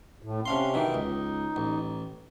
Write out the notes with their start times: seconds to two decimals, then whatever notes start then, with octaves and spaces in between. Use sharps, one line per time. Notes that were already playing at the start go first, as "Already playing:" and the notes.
0.23 A2
0.46 C3 C#4 D4 F5 C6
0.74 B2 D#3 E3 D#4
0.94 C#2
1.56 A1